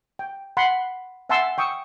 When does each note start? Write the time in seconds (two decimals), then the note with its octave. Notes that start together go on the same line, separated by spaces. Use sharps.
0.19 G5
0.57 F#5 B5 C6
1.29 E5 F#5 G#5 A5 C6 E6
1.58 G5 C#6 D#6 E6